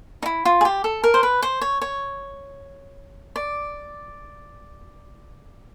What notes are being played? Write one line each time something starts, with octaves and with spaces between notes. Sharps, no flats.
D#4
E4
F4
G#4
G4
A4
A#4
C5
B4
C5
C#5
C#5
D5